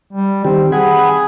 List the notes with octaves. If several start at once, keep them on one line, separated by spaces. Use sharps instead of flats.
G3
D#3 C4 G4
G#4 F#5 G#5 B5